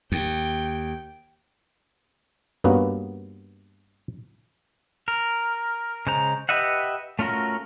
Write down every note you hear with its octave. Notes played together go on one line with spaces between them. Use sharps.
D#2 G5
G2 A#3 B3 C#4 F#4
A#4
C#3 G#3 C5 A#5
G4 B4 D#5 E5 F#5
A3 C#4 F4 F#4 A#4